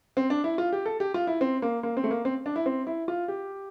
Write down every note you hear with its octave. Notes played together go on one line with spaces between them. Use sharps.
C4
D4
E4
F4
G4
A4
G4
F4
E4
C4
A#3
A#3
C4
A3
A#3
C4
D4
E4
C4
E4
F4
G4